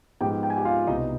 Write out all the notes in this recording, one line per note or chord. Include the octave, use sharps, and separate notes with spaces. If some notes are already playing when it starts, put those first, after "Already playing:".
G#2 F3 B3 G4 G5
G5
G#5
G4 G5
F4 F5
C2 B2 B3 D#4 D#5